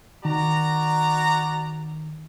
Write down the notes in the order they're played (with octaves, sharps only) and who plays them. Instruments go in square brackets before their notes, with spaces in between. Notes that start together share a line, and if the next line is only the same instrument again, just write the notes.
[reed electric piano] D#3 [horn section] F#4 D5 A#5